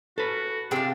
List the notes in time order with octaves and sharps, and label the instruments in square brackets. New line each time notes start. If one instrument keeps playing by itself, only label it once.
[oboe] F#4 [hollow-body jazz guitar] A4 B4
[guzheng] C3 F4 [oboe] D4 [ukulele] G#4 G5